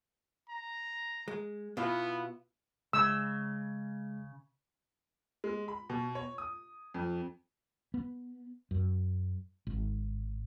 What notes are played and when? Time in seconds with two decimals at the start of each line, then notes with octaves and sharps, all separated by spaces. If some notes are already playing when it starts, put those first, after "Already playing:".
0.49 A#5
1.28 G#3
1.77 B2 B3 E4 F4
2.93 C#3 G#3 E6
5.44 G#3
5.68 B5
5.90 B2
6.15 C#5
6.38 D#6
6.94 F2
7.94 B3
8.71 F#2
9.67 G#1